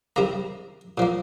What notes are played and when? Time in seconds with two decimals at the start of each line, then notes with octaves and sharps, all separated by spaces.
0.16 C3 D#3 G3 A#3 A#5
0.98 A#2 F3 A#3